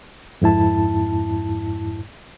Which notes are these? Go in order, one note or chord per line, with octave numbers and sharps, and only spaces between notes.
F2 G#2 E4 A5